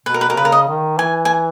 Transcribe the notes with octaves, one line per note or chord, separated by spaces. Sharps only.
B2 B4
A#4
B4
B2 A#4
C#3 B4
A#4
D#5
D#3
E3 G#5
G#5